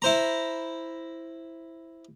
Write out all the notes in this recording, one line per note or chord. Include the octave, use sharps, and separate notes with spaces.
E4 C5 A#5